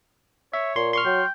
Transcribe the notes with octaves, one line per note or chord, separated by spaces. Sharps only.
C#5 E5
A#2 C6
C6 C#6 F6
F#3 G5